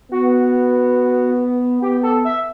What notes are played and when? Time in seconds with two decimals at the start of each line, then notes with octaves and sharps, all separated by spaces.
0.12 B3 F#4
1.82 B3 G4
2.03 A4
2.25 E5